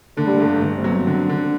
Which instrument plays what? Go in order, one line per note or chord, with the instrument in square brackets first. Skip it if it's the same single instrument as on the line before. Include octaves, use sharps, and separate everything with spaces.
[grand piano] D3 [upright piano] A3
[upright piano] G3
[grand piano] G1 [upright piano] A3
[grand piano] G1
[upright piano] C4
[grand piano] F#3 [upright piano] B3
[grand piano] D3
D3